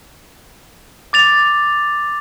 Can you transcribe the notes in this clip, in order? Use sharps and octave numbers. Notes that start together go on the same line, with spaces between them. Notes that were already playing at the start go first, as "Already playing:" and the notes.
D6 A6 F7